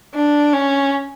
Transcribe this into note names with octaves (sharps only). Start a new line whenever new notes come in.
D4
C#4